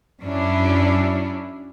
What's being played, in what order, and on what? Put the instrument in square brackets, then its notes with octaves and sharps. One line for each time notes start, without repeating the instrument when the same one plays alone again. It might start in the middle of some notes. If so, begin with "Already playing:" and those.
[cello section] F#2 F#3 C#4 D4 E4